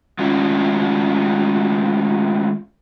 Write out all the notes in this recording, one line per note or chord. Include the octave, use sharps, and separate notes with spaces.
D#3 G#3 A3 C#4 D4 F4